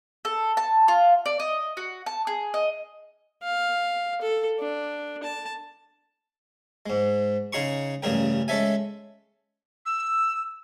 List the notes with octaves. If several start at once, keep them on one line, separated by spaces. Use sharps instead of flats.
A4
A5
F4
D5
D#5
F#4
A5
G#4
D#5
F5
A4
D4
A5
G#2 G#3
C#3 D#4 G#4 C6 C#6
A1 G2 C#3 G#4 A#4 G5
G#3 C#4 A4 E5 G#5
E6